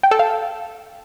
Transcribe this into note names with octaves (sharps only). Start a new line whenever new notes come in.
G5
A4
F5